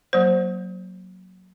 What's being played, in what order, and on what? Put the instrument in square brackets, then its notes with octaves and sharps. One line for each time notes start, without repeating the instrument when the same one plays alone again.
[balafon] F#3 A#3 C5